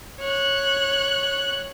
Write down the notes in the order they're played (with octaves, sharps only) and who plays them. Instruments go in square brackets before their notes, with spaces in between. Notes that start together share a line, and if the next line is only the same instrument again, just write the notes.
[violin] C#5 F#6